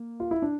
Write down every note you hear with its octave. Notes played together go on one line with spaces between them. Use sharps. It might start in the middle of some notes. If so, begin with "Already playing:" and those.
Already playing: A#3
F4
E4
D4